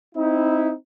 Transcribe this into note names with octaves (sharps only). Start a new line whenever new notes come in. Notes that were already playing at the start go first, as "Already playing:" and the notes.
C4 D#4 E4